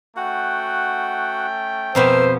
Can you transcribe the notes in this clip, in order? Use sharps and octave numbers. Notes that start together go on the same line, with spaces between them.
A3 C#4 F#4 F#5 G5
F2 B2 B3 A#4 C5 E6